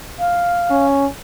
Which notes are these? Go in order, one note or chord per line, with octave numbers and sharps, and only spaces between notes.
F5
C#4